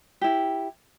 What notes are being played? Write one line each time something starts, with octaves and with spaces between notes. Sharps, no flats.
E4 G4